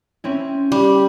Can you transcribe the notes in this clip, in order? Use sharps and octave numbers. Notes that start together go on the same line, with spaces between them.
C4 C#4 E4
G3 G4